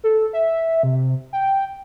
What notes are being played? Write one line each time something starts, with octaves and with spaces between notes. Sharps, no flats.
A4
E5
C3
G5